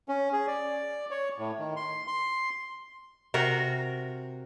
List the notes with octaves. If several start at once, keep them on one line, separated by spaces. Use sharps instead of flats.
C#4
G#4
D5
C#5
A2
D#3
C6
C6
C3 F#4 A#4